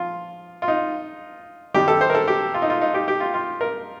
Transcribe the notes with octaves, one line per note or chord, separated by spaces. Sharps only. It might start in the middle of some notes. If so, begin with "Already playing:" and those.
Already playing: F3 F4
F4
D#4
G2 D#3 G3 G4
A4
C5
A#4
A4
G4
F4
D#4
F4
D#4
G4
G4
F4
F4
A#4